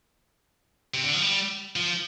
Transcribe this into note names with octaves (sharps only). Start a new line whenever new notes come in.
C3
D3
F3
G3
F3